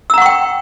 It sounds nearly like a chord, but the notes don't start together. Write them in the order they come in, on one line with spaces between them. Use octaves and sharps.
E6 A#5 F#5 C#6 G5